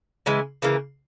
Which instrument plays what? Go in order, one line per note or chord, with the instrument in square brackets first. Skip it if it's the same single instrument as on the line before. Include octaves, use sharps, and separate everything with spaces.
[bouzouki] C#3 E3 G#3
C#3 E3 A#3